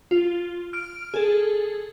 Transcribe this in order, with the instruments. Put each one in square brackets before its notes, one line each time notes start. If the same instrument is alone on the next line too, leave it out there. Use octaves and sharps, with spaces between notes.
[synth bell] F4
F6 D7
G#4 A4